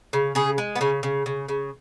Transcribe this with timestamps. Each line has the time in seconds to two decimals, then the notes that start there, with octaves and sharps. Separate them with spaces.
0.13 C#3
0.35 C#3 G#4
0.58 G#3
0.76 B3
0.81 C#3 C#4
1.03 C#3
1.26 C#3
1.48 C#3